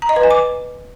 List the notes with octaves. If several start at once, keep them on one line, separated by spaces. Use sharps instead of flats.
A#5
D#5
B4
G#5
D6